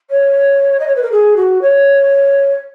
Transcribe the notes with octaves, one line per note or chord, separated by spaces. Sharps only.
C#5
D#5
C#5
B4
A#4
G#4
F#4
C#5